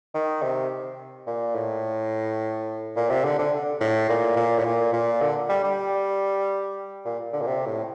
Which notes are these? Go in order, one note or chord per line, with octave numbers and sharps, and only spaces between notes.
D#3
C3
A#2
A2
A#2
C3
D3
D3
A2
A#2
A#2
A2
A#2
A#2
D3
G3
G3
A#2
D3
A#2
C3
A2